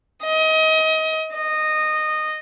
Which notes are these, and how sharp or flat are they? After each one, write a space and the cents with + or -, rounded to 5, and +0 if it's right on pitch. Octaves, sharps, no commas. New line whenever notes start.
D#5 +30
D#5 -15